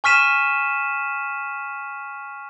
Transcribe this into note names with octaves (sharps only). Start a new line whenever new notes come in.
G#5 C#6 F6 B6 D#7 E7